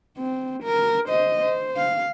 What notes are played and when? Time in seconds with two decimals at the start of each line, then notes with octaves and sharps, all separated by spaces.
0.18 C4
0.63 A#4
1.09 C5 D#5
1.43 C5
1.77 F5